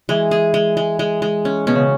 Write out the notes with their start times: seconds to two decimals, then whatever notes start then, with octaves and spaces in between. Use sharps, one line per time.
0.09 E3 G#3
0.31 G#4
0.54 G#3
0.77 G#3
0.99 G#3
1.22 G#3
1.45 C#4
1.67 B2 C#4
1.75 C#3